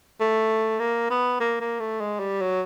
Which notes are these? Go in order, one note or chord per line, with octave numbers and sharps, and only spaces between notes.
A3
A#3
B3
A#3
A#3
A3
G#3
G3
F#3